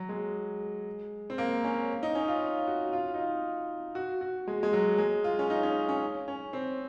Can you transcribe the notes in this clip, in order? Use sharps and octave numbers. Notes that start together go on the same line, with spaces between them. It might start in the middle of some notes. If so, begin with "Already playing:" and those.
Already playing: F#3
G#3
C4
A#3
C#4
D#4
C#4
F4
F#4
F4
D#4
F4
F#4
F#4
G#3
G#3
F#3
G#3
F4
C#4
D#4
C#4
C#4
C#4
C4